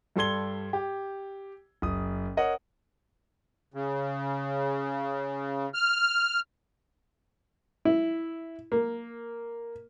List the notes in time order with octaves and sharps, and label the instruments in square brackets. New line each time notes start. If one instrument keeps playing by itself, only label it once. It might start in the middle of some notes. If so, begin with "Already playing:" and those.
[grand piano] G2 G3 A4 C6 G#6 G7
G4
F#1 D#6
A#4 C#5 D#5 F#5
[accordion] C#3
F6
[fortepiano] E4
A#3